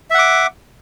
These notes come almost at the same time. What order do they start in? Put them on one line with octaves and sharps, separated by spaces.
E5 F#5 D6